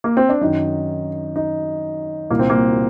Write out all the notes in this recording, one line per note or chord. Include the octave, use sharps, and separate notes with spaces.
A#3
C4
D4
F#2 D#3 D#4
D#4
C2 A#2 A#3
C4
A#3